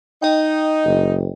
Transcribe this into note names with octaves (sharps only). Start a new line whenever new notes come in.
D#4 D#5 G5
F#1